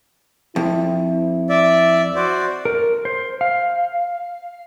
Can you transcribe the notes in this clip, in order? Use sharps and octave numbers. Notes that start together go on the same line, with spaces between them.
F2 E4
D5 E5
F#4 C5 D5
A#4
C5
F5